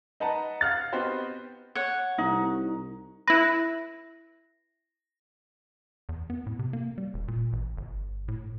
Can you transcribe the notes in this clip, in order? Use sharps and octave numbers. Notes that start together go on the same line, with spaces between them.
D#4 B4 F#5 A5 A#5
F5 F#5 F6 F#6 A6
B3 C4 D#4 F#4 G4 C5
C#5 F#5
C2 D#4
E4 B4 A#6
E2
B3
A2
C3
A#3
G3
E1
A#2
A1
G1
A2